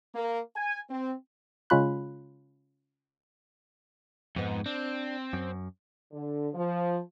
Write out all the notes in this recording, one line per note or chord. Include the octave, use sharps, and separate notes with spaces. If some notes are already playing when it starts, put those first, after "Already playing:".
A#3
G#5
C4
C#3 G#3 C#4 F4 B5 F#6
F2 G#2 B3
C4 D4
F#2
D3
F3